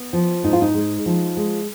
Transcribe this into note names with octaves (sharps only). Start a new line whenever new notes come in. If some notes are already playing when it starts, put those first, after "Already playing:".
Already playing: B3
F3
G#2 D#4
F4
D#4
G#3
F3
G#3